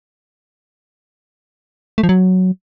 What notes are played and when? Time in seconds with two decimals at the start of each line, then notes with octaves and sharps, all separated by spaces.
1.98 A3
2.03 F3
2.09 F#3